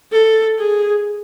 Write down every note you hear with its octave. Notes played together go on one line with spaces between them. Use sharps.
A4
G#4